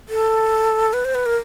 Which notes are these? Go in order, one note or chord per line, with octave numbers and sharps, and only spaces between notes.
A4
B4
C5
B4
A#4